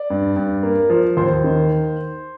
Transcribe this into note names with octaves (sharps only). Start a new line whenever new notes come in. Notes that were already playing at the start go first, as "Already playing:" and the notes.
Already playing: D5
G2
G2
A#3
F3
D#2 C5
D#3